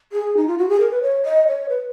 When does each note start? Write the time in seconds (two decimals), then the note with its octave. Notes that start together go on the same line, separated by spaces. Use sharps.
0.12 G#4
0.37 D#4
0.48 F4
0.58 F#4
0.69 G#4
0.80 A#4
0.91 B4
1.02 C#5
1.25 D#5
1.48 C#5
1.69 B4